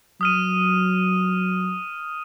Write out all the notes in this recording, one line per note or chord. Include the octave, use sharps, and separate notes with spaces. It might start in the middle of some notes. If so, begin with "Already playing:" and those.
F#3 D#6 F6 D#7